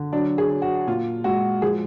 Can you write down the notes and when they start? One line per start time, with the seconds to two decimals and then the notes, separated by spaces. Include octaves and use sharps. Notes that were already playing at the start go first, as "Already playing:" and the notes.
Already playing: D3
0.13 F#3 D4
0.38 G#4
0.50 F#3
0.62 F#4
0.87 A#2 F4
1.24 G#3 F#4
1.62 F3 G#4